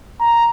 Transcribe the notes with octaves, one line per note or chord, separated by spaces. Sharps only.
A#5